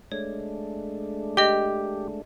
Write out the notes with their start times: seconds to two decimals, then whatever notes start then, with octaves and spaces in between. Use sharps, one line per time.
0.12 G#3 A3 D4 C#5
1.37 G4 D#5 G7